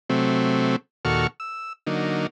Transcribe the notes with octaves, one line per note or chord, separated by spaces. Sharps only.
C3 F#3 A3 C4
D#2 A#2 F#4 A4 C#6 F6
E6
D3 F#3 A#3 D#4